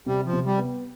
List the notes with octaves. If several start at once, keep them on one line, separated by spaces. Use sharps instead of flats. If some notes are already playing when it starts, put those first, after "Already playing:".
C3 G3
F3
C3
G3
B3